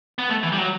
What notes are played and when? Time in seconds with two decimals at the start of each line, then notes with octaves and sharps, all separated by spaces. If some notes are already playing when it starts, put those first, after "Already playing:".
0.19 B3
0.29 A3
0.43 E3
0.52 G3
0.58 F#3